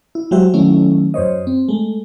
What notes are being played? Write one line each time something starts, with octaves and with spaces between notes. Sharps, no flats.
E4
F#3 G#3 F#4 G4 C5 E5
D#3 F#3 A3 C#4 E4
F#2 C5 C#5 D#5
C4
G#3 A3